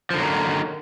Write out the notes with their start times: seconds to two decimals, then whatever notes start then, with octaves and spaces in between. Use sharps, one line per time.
0.11 F3
0.14 D3
0.17 F#3
0.20 A#3
0.23 D#3